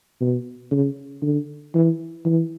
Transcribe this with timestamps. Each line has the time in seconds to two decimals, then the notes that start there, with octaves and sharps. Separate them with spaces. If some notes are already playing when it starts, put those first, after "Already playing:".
0.21 B2
0.71 C#3
1.22 D3
1.74 E3
2.25 E3